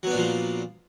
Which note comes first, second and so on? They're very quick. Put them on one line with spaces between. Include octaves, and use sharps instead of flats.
F#3 B3 D4 A#2 F3